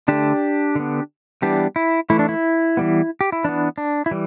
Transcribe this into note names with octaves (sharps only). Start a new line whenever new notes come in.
D3 A3 D4 G4
D3 B3
E3 G3 B3 D4 G4
E4
E3 A3 E4
D4
E4
E3 G3 B3
G4
E4
E3 B3 D4
D4
E4
E3 G3